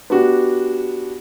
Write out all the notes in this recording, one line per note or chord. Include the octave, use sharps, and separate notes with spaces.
B3 D4 F#4 G4